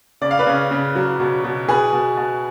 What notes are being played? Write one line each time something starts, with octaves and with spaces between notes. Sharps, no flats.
C#3 D5
F5
B4 D5
C#3
C#3
F#3
B2
B2
B2 G#4 B4
B2
B2